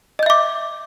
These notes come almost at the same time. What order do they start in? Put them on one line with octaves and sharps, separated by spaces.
D#5 G6 E5 D6